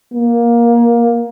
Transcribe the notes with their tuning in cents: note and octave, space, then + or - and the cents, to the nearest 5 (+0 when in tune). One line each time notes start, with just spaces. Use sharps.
A#3 +15